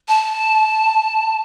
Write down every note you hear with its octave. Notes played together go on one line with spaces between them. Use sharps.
A5